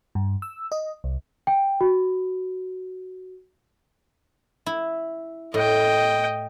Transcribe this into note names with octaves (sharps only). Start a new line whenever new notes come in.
G2
E6
D#5
C2
G5
F#4
E4
A2 D#5 G5